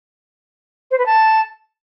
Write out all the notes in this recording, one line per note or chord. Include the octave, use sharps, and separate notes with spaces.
C5
B4
A5